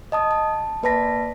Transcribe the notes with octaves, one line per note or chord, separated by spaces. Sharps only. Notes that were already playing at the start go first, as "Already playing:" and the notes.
D#5 A5 D#6
A5
A#3 B4 D5 A5 A#6 B6